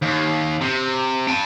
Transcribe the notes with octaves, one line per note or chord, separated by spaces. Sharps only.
D#2
C3
G5 A5